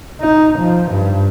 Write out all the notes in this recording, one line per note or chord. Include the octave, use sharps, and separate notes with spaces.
D#4
F3
G2